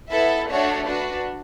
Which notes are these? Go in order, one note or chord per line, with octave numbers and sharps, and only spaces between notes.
B3 E4 A4 E5
A3 D4 F#4 C#5
D4 F#4 B4